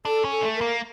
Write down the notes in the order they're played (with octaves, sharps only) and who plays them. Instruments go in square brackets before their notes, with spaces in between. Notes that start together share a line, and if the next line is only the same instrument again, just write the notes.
[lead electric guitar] D4 [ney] A4
[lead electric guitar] C#4
[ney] A4
[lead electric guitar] A3
[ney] A#4
[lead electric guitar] A#3